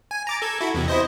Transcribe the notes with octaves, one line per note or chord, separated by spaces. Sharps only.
G#5
A#5 D6 A6
A4 G#6
E4 F#4
E2 C3
E4 C5 D#5